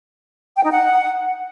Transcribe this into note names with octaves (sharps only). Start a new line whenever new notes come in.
G5
D#4
F#5